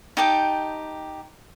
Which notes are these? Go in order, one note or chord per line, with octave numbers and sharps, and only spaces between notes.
D#4 G4 G5 A5